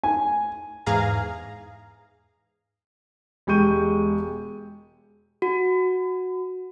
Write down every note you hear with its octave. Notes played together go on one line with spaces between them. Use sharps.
G#5
E2 G#2 G#4 F5 A#5
E1 G#3 G4 C#6 G6 D#7
F#4